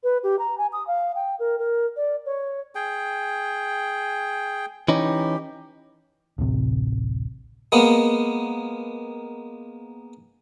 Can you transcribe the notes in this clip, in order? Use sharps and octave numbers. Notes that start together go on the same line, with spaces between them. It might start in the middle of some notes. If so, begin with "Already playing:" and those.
B4
G4
A#5
G#5
D#6
F5
G5
A#4
A#4
D5
C#5
G#4 G5
E3 C#4 D#4 G4
D1 A1 C3
G#3 A#3 B3